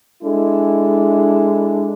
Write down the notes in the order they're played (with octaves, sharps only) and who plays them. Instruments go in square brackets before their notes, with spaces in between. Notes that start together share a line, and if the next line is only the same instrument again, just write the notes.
[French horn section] G#3 D4 E4 A4